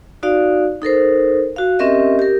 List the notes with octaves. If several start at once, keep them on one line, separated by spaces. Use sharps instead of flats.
D#4 F#4 D5 F5
D#4 A4 A#4 C5
F#4 F5
C4 C#4 G4 A#4 D#5 E5
G4 A#4